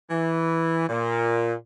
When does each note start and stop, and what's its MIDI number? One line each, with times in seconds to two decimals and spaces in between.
0.11 0.84 52
0.89 1.54 46